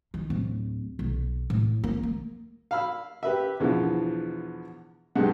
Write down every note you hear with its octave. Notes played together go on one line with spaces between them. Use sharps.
D#3
D1
B1
A2
A#3
A#3
F5 B5 E6
G4 B4 E5
E2 B2 D3 E3 F3
B1 G2 G3 G#3 F#5